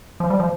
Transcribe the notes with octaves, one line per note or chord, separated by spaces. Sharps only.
F3
G3
F3